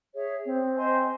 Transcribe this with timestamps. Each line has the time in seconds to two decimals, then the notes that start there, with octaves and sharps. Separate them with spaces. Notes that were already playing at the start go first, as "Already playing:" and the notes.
0.14 G#4 C#5 E5
0.46 C4
0.76 C5 D#5 G#5 C6